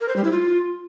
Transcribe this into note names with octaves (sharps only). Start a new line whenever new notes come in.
A#4
C5
G3
E4
F4